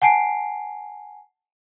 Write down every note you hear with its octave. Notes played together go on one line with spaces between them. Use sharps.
F#5 G#5 A5 C7 D7